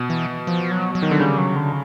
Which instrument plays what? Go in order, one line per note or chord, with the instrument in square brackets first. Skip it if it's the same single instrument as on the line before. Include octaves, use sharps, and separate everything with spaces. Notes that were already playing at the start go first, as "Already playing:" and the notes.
Already playing: [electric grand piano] B2
[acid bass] E3
F3
F#3
F#3
[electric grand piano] D#3
D3
[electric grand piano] C#3 [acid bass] G3
[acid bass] F#3
D3